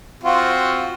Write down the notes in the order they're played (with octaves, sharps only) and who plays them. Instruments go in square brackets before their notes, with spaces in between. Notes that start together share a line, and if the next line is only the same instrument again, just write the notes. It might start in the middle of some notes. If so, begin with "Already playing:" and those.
[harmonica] C4 F4 F#4